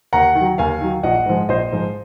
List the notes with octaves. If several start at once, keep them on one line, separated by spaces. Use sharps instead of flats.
D#2 F#5 A#5
D#3
F#3
D#2 F5 G#5
D#3 F#3
A#1 D#5 F#5
G#2 F3 G#3
A#1 C5 D#5
G#2 F3 G#3